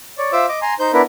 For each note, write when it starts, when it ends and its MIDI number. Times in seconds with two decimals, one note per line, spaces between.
0.18 0.31 73
0.18 0.31 74
0.33 0.46 65
0.33 0.46 72
0.33 0.46 76
0.33 0.46 86
0.33 0.46 88
0.49 0.59 75
0.49 0.59 86
0.62 0.74 80
0.62 0.74 82
0.62 0.74 84
0.80 0.91 63
0.80 0.91 72
0.80 0.91 91
0.93 1.02 59
0.93 1.02 62
0.93 1.02 64
0.93 1.02 70
0.93 1.02 71